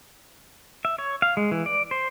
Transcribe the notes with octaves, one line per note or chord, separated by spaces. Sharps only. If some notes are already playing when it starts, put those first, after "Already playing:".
E5
C#5
F5
G#3
E3
D5
C5